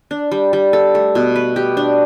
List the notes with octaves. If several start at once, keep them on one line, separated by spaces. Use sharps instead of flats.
D4
G3
G3
A4
A3
B2
B4
G4
D4